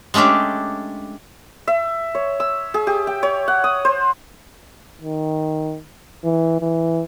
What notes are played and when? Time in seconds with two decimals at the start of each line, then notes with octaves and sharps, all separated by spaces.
0.14 G#3 A3 C#4 D4 G4
1.67 E5
2.15 C#5
2.40 E6
2.74 G#4
2.87 G4
3.07 G5
3.23 C#5
3.48 F#5
3.64 D#6
3.85 C5
5.02 D#3
6.24 E3
6.60 E3